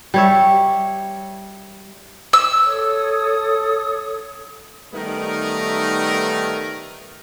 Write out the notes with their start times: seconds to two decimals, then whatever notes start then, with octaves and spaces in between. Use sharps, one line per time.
0.14 G3 C#5 E5
2.33 E6
2.65 A4 C#5 D#6
4.93 D#3 G3 A3 B3 D#4 A#4